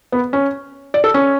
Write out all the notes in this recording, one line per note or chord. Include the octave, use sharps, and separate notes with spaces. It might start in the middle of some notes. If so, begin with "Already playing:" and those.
B3
C#4
D5
A4
C#4